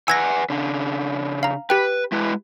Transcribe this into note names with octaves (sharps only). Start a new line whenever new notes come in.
B4 F#5 G#5 E6 G#6 A#6
C#3 D4
F5 A#5
G4 B4 G5
G#3 E4 B4